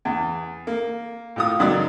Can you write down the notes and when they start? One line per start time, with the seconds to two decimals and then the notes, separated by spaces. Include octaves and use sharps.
0.05 E2
0.67 A#3
1.36 A2 F4 D#6
1.59 C#2 F#2 F#3 D#4 D5 D#6